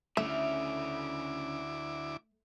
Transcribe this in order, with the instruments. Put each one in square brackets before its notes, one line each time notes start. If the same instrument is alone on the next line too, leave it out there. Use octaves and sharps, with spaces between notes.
[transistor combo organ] D2 E4 D6 [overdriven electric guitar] C#3 [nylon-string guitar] A3 [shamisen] E5